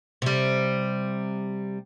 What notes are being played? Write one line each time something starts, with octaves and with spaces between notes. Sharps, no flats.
C3 G3